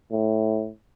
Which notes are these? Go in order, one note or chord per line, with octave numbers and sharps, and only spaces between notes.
A2